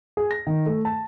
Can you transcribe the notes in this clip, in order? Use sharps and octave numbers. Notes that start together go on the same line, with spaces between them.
G#4
A#6
D#3
A3
A5